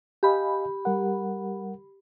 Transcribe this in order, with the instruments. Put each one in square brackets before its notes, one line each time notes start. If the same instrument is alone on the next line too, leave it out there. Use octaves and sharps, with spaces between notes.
[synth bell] G4 B5 [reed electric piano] D#5 F5 G#5
[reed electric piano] G3 A#4 F#5